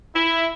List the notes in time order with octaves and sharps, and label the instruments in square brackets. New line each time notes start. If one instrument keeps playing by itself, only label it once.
[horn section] E4